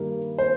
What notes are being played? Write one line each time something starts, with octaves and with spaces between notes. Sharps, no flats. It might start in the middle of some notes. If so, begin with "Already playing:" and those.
Already playing: G2 D#3 G3 A#3
C5